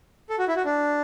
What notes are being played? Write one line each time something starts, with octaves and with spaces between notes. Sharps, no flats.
A4
F#4
E4
F#4
D4